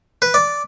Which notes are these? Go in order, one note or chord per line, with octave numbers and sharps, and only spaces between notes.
B4
D5